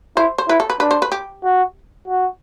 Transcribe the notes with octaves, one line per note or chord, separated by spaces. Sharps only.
E4 C5
C5
E4 B4
A4
B4
D4 B4
C5
B4
G4
F#4
F#4